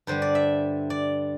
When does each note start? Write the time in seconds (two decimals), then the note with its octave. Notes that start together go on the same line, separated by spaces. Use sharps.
0.07 G2 D3 G3 C5
0.22 D5
0.35 E5
0.90 D5